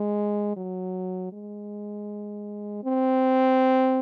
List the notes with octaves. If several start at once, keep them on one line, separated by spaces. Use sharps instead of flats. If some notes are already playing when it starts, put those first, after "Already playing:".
Already playing: G#3
F#3
G#3
C4